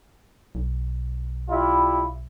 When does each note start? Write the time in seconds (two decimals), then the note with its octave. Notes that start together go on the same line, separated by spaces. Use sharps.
0.55 B1
1.48 G3 E4 F4